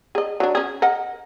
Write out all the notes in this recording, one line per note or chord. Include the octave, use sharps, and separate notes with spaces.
G#4 D#5
F#3 D4
C#4 G#4
A#4 D#5 F#5